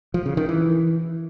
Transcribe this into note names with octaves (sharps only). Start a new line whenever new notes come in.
F3
C#3
D#3
E3